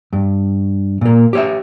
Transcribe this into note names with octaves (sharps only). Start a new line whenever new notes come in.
G2
A#2 A#3
G4 C#5 E5